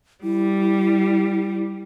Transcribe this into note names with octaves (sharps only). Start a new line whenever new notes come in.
G3 E4